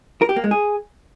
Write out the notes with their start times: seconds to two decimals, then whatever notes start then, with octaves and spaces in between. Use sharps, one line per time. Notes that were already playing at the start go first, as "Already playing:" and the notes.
0.22 A#4
0.29 G4
0.36 A#3
0.44 G#3
0.51 G#4